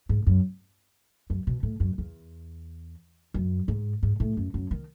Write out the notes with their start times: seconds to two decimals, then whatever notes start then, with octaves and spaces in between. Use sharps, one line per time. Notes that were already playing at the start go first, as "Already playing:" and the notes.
0.09 G#2
0.27 F#2
1.30 F#2
1.47 B2
1.63 A2
1.80 F#2
1.98 E2
3.34 F#2
3.68 G#2
4.03 G#2
4.20 A2
4.37 F#2
4.54 F#2
4.71 D#3